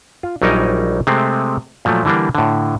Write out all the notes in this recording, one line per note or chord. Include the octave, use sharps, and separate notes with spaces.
F4
A#1 F#3 G3 D#4 A#4 G#5
C3 G#3 A3 C4
A#2 F3 F#3 A3
D3 E3 G3 A#3 D4
A2 D3